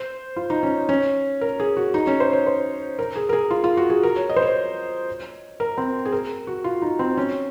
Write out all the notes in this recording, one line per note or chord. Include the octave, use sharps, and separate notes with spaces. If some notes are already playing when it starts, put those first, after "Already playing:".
Already playing: C5
F4
D#4
C#4
C#4
A#4
G#4
F#4
D#4
C#4
C5
C#5
C5
A#4
G#4
A#4
G#4
F4
F4
F#4
G#4
A#4
C#5
D#5
C5
C#5
A#4
C4
G#4
A#4
F#4
F4
D#4
C4
C#4